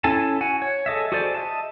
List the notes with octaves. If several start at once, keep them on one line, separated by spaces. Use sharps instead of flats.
C#4 E4 A4 G#5 A5
F#4 G#5
C#5
G#4 A4 D#5 E5
F#4 G#4 A4 C5 D5
D#5 E5 A5